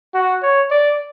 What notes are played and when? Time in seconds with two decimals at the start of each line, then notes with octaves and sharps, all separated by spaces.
0.14 F#4
0.42 C#5
0.71 D5